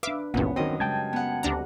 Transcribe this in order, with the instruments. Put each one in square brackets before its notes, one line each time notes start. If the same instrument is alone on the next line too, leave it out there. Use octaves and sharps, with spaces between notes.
[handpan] D4 B4 [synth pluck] E5 F5 D6
[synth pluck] G#1 C#2 G2 [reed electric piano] A#2 E3 [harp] B3 [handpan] C#4 F#5
[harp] F#2 D#5 [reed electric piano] D#3 F#3 C4
[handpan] C#3 G3 G#3 [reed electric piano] G5 A5 G#6
[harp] B3 F#5
[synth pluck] D2 D4 A#5 [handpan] C4 G4